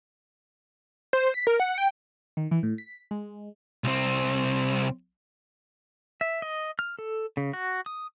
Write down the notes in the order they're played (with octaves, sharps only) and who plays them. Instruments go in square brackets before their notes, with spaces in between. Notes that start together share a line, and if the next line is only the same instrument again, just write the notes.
[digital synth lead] C5
B6
A#4
F#5
G5
[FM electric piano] D#3
E3
A2
B6
G#3
[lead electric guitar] C2 C4
[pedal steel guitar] E5
D#5
F6
A4
C#3
F#4
D#6